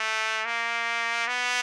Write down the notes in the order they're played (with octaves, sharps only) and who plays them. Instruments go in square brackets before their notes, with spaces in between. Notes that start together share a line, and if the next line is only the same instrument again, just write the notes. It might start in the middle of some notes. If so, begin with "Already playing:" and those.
Already playing: [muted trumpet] A3
A#3
B3